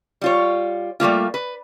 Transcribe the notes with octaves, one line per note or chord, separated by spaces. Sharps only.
G3 F4 C#5
G3 A3 A#3 F4
B4